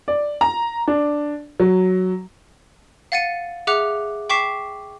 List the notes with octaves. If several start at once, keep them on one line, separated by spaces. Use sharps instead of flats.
D5
A#5
D4
F#3
F5 F#5 A6 C#7 D#7
G#4 E5 F#5 D6 F#6 F7
G5 C#6 D6 B6 C7 E7